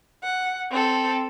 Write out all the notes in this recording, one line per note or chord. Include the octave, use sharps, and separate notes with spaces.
F#5
C4 A4